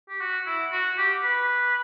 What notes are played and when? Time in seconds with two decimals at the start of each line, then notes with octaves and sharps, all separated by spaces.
0.09 G4
0.21 F#4
0.47 E4
0.72 F#4
0.98 G4
1.24 B4